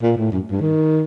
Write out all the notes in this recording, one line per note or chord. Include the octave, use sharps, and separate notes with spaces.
A#2
A2
F#2
G2
D#3